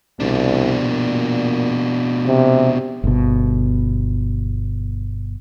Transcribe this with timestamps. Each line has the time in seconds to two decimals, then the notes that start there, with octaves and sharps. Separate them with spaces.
0.20 C2 B2 D4
0.85 A#2
2.26 C3
3.04 G1 B2